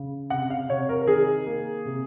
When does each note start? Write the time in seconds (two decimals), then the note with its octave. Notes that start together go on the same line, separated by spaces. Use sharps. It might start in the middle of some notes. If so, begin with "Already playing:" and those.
Already playing: C#3
0.30 C3 F#5
0.50 F5
0.69 C3 C#5
0.89 A#4
1.02 A#4
1.07 D#3 G#4
1.46 A#3
1.85 C3